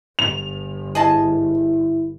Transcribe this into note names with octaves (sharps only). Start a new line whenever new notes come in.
G1 F7
E4 G#4 D#5 A5